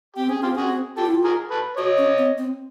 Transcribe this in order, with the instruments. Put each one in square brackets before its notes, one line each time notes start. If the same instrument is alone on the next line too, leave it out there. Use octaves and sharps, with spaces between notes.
[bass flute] C4 [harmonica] G4
[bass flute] C#4 [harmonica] G#4
[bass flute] C4 [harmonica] F4 G4
[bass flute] C#4 [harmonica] F#4 G#4
[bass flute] C4
[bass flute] F4 [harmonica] G4 A4
[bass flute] E4
F4
[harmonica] G#4 A#4
A4 B4
[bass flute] F#4 [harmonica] C#5 D#5
[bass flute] C#4
C4
C4